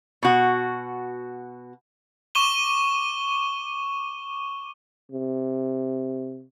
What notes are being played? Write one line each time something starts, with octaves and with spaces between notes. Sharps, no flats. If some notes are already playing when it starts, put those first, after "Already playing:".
B2 F#4
C#6 D6 D#7 E7 G7
C3